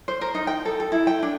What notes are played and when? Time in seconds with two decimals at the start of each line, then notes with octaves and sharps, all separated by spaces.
0.08 C5
0.21 A#4
0.35 D#4
0.47 G5
0.65 A4
0.80 A4
0.92 E4
1.07 G5
1.23 D4